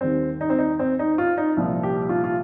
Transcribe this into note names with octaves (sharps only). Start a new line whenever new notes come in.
D#2 D#3 G3 C4
D#4
C4
D#4
C4
D#4
F4
D#4
C2 A#2 F3
G4
F4
F4